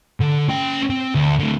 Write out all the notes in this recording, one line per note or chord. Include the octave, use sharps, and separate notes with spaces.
D3
C#4 G5
C4
D2
A2 D3